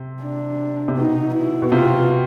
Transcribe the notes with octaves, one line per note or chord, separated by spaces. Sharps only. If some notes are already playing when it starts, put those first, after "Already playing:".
Already playing: C3
D4
C3
B2 D#4
E4
B2
C3 F4